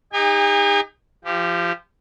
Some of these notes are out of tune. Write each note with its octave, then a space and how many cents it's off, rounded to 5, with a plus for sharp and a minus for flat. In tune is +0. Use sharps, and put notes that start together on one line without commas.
D#4 +0 G4 +45 G#5 -40
F3 -25 G4 +0